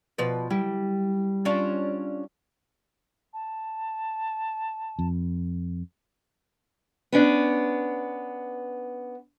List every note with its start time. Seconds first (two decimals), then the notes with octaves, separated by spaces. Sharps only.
0.18 B2 F3 B4
0.50 G3 E4
1.45 C#4 D4 F4
3.34 A5
4.99 F2
7.12 B3 C#4 D4